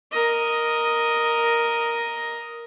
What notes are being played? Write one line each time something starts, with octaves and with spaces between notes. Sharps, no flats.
A#4 D#5